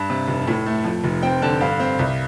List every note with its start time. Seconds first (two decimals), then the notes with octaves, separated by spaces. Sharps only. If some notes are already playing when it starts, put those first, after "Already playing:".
Already playing: G2 A5
0.10 C3
0.27 F1
0.47 A2
0.66 A3
0.84 F2
1.04 F1
1.22 C4 G5
1.42 D3 A5
1.60 G2 F5
1.80 C4
1.99 C2